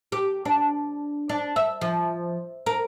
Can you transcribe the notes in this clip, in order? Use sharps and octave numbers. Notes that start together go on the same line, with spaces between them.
G4
D4
D4
E5
F3
A#4